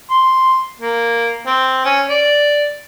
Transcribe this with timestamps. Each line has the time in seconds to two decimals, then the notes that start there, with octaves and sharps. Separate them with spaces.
0.10 C6
0.80 A#3
1.46 C4
1.85 C#4
2.09 D5